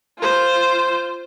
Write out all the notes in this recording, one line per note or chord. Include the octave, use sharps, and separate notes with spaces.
F4 C5